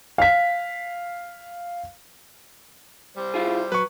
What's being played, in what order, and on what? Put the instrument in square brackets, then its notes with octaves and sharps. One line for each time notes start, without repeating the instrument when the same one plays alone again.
[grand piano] F5 B6
[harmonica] G3 C5
[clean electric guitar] E4 F4 G#4
[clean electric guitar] F#3 [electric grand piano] B4 C#6